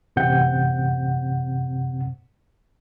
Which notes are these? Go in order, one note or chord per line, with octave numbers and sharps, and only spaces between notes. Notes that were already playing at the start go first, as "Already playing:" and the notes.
A1 F#2 C3 C4 F#5 G6